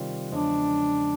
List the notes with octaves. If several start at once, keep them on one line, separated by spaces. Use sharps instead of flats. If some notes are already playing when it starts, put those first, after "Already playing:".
Already playing: C3 D#3 G3 C4 F4
E2 C#3 F3 G#3 C#4 D4